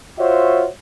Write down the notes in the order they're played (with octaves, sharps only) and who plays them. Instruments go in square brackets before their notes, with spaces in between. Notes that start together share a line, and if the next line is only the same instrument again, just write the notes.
[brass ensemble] F4 F#4 C5 C#5 E5